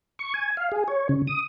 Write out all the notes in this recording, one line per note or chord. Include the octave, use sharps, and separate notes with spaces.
C#6
G#5
F5
G#4
C#5
C#3
D#6